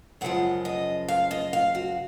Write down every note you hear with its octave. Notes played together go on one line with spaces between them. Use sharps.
F#2 C#3 F3 G#3 F#5
D#5
F5
D#5
F5
F#4